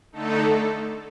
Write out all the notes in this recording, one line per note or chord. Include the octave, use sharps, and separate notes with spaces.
D3 A3 D#4 A4